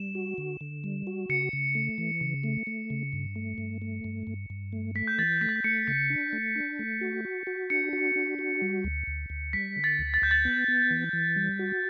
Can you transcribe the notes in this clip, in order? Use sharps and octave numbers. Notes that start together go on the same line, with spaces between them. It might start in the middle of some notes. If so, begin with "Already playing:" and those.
Already playing: G3 E7
F#4
D3
D3
G3
F#4
C#3 C#7
C#3
A3
E3
C#3
A3
A3
C#3
G2
A3
G2
A3
G2
G2
G2
A3
A3 B6
G6
E3 A6
A3 B6
A6
B6
A3 C#7
C#3 B6
D4
A3
D4
A3
F#4
F#4
F#4
D4 C#7
F#4
D4
F#4
G3
D2
D2
D2
G3 B6
D3
A6
D2
A6
D2 G6
A6
B3
B3
E3
E3
G3
F#4